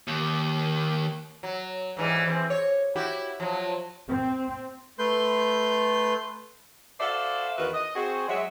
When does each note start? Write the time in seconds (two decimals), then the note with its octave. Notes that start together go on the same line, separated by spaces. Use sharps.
0.08 D#2
1.43 F#3
1.97 G#2 E3 G3
2.26 E3 C4
2.50 C#5
2.96 E4 F#4 G4
3.40 F3 F#3
4.08 C4
4.99 A3 B4 C6 G6
7.00 F#4 A4 C5 D5 E5 F5
7.58 E2 D#3 F#4 B4
7.74 D#5
7.95 C4 F#4 G#4
8.28 F#3 G#3 E5